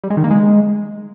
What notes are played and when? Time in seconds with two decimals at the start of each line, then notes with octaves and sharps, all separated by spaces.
0.03 G3
0.10 G#3
0.17 D#3
0.24 A#3
0.31 G#3